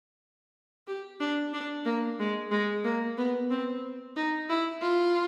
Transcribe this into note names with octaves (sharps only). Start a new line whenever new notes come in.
G4
D4
D4
A#3
G#3
G#3
A#3
B3
C4
D#4
E4
F4